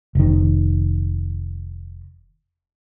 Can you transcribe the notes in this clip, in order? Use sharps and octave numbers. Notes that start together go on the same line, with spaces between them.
F1 D#3